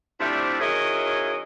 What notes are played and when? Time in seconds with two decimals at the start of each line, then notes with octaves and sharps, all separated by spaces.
0.20 C3 F3 G3 A3 D4 E4
0.60 D#3 F#3 C#4 E4 G#4 D#5